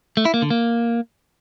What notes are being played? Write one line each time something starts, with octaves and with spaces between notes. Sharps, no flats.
A3
E4
A#3
D3
A#3